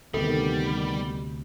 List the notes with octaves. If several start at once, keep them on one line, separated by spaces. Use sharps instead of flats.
D2 C3 D#3 G3 B3 A4